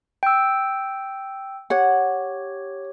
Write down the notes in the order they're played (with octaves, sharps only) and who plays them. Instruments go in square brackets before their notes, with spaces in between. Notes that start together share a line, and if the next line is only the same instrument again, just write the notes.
[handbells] G5 E6
[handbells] G4 C#5 [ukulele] F#5